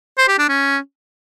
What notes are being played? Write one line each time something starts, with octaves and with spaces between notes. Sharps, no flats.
C5
G4
D4
C#4